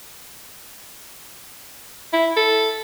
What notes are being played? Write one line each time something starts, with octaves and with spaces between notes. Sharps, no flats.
E4
A4